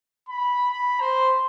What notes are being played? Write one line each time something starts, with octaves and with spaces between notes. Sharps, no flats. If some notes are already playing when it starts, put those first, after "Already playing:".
B5
B5
C5